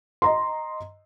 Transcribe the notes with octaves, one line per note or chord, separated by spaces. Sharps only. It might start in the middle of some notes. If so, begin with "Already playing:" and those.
D#5 A#5 C6